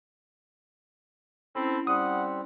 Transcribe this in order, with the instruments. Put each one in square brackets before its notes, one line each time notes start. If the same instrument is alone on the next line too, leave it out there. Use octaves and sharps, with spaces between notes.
[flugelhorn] C4 [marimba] C#4 E4 [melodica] A4 B5
[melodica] G3 C4 [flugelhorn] F#5 [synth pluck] D#6